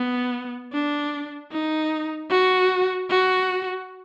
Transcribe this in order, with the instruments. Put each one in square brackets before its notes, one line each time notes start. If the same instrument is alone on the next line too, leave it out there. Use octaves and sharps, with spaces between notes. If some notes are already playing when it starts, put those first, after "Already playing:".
Already playing: [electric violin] B3
D4
D#4
F#4
F#4